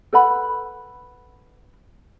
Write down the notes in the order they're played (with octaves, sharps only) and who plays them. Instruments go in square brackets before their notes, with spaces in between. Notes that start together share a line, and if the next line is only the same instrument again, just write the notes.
[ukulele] A4 B4 F#5 B5